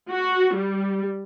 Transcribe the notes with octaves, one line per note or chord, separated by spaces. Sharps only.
F#4
G3